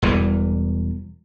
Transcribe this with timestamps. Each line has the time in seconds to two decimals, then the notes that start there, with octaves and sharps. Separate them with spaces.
0.02 E1 E2 E3 G3